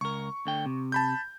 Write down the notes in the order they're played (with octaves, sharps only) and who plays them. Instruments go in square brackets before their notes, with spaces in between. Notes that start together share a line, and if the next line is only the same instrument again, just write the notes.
[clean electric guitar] C#2 A#4 [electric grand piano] C#6
[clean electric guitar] D2 D3 G5
C3
[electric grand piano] A5 B5 G6